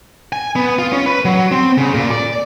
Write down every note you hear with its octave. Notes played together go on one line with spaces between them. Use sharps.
G#5
B3
F4
C#4
B4
F#3
C4
C#3
A#2
D5